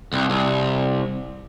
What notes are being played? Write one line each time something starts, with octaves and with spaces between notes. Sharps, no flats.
C2
C2